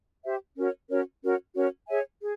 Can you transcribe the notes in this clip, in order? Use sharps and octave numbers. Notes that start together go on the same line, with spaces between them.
G4 C5 E5
C#4 F#4 A#4 C#5
C#4 F#4 A#4 C#5
C#4 F#4 A#4 C#5
C#4 F#4 A#4 C#5
G#4 C#5 E5 G#5
G#4